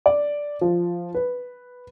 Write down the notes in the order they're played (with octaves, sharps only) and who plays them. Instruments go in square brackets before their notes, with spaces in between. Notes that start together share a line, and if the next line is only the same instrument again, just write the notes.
[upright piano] D5
F3
B4